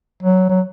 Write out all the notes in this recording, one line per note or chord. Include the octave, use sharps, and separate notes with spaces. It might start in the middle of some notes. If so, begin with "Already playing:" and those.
F#3
F#3